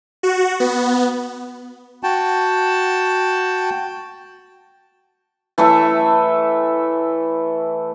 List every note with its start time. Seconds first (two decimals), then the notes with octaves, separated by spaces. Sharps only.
0.23 F#4
0.60 B3
2.03 F#4 G5 A5
5.58 E3 A3 C#5 E5